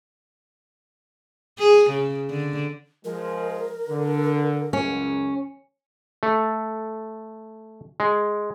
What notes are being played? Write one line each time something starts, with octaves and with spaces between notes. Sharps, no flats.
G#4
C#3
D3
F3 G#3 A#4
D3
C#2 F#2 C#4
A3
G#3